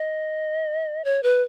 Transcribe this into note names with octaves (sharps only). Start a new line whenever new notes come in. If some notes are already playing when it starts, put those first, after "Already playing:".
Already playing: D#5
C#5
B4